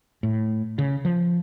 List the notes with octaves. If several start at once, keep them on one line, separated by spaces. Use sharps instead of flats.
A2
C#3
F3